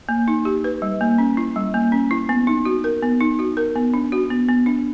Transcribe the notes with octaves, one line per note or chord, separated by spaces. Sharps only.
A#3
D#4
G4
B4
G3
A#3
C#4
E4
G3
A#3
C#4
E4
B3
D#4
F#4
A#4
B3
D#4
F#4
A#4
B3
D4
F#4
B3
B3
D4